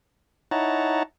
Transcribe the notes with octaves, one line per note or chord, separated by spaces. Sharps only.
D#4 E4 C#5 F#5 A5 A#5